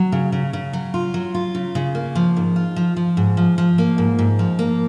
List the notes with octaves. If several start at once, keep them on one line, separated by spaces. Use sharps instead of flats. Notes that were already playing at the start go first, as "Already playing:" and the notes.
Already playing: F#3
C#3
C#3
C#3
F#3
F4
F#3
F4
C#3
C#3
A#3
F3
G#2
F4
F3
F3
G#2
F3
F3
A#3
G#2
G#2
F3
A#3